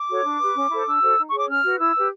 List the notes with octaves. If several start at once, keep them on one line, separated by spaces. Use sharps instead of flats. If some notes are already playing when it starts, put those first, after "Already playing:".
Already playing: D6
F#4 A4 C#5
D4
G4 B4
C#4
E4 A4 C5
D4 E6
F#4 A4 C5
D#4
C#6
G#4 C#5 D6
C#4 F6
F#4 B4
E4 E6
G4 B4